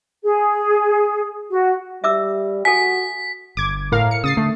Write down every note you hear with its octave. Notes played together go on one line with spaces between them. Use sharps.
G#4
F#4
G3 E5 D6 E6
F#4 A4 G#5 B6
G1 D6 G#6
A2 A#4 F5
C#7
C#3 D#6 A6 C7
D3 A3